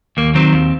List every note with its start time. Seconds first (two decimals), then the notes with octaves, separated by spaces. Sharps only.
0.17 D#2 A#3
0.35 D#3 F#3 C4
0.53 D#2